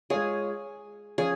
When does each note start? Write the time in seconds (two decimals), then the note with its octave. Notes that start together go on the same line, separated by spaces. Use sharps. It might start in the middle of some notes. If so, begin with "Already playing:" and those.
0.10 G#3 F4 G#4 C#5
1.18 F3 C#4 F4 G#4 C#5